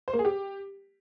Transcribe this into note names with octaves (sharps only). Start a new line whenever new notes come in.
C5
A#3
G#4
G4